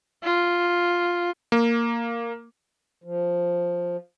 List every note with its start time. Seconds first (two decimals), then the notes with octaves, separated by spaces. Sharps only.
0.24 F4
1.52 A#3
3.04 F3